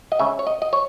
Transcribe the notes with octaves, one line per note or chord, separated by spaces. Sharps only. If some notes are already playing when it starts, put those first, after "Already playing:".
D#5
C#3 G#3 C#4 E5
C#5
D#5
D#5
C#5